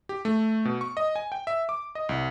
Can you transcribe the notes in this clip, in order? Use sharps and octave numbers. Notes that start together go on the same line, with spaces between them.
G4
A3
B2
C#6
D#5
G#5
G5
E5
D6
D#5
C2